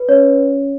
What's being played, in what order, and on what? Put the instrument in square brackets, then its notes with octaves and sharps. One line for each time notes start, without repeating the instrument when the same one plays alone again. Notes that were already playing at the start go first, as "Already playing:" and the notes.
Already playing: [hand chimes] B4
[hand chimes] C#4 [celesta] C#5